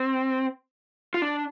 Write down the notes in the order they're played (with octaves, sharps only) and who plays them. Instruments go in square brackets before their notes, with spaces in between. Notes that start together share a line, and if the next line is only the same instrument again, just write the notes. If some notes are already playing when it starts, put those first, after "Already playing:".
Already playing: [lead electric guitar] C4
F4
D4